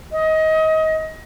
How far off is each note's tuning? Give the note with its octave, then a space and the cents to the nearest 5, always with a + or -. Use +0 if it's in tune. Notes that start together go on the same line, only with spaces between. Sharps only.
D#5 +25